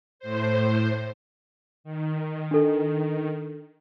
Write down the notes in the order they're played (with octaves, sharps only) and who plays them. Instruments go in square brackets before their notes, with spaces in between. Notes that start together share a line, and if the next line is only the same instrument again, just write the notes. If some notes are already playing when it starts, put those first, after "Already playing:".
[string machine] A2 C5
D#3
[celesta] D4 A4